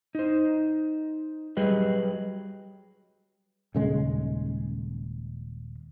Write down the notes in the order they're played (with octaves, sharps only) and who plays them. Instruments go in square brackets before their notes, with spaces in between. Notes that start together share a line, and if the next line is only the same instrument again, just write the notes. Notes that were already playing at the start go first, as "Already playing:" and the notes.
[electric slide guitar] D#4 C5
F#3 G3 G#4 B4 D#5
[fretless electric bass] D#1 C#3 G#3